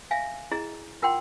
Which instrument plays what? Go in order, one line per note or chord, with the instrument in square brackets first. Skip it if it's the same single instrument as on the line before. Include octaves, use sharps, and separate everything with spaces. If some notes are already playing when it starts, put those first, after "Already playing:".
[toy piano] E5 F5 G#5
E4 G#4 D#5 A#5
F4 A#4 F#5 G5 C6